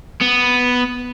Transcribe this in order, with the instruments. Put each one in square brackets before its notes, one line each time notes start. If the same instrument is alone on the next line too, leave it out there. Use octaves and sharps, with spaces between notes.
[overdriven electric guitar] B3